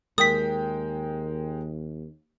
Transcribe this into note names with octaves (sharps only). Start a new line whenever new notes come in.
D#2 G#3 A#4 G5 D#6 B6